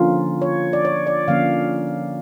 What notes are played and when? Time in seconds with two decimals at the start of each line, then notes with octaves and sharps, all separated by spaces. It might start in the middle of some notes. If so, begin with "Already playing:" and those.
Already playing: D3 F3 A#3 C#4 F4
0.42 C#5
0.73 D5
0.85 C#5
1.07 D5
1.28 D3 F3 A#3 C#4 F5